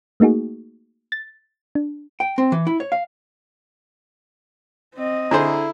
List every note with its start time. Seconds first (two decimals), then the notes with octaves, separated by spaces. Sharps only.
0.20 A3 A#3 D#4 F#4 G#4
1.12 A6
1.75 D4
2.20 G5
2.38 C4
2.52 E3
2.67 E4
2.80 C#5
2.92 F5
4.95 C4 D#5
5.31 D3 E4 G#4 A4 C5 A#5